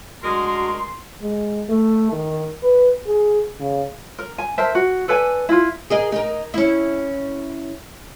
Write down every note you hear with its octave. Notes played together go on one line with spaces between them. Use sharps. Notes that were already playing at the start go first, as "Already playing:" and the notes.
D1 G#3 D4 F#4 A#4 C6
G#3
A3
D#3
B4
G#4
C#3
A#4
G#5
A#4 C5 E5 A5
F#4
A4 B4 D5 G#5
E4 F4
G#4 A#4 D#5
D#4 A#4
C#4 E4